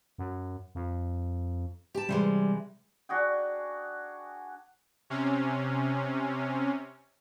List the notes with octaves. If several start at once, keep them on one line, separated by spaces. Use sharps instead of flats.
F#2
F2
G4 A5
C3 E3 G3 G#3
D4 F#4 G#4 G5
C3 C#4